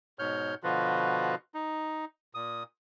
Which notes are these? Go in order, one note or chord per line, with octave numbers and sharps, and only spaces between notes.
G#2 B2 C#5 F6 G6
B2 D3 F3 F4 F#4 B4
D#4
A#2 D#6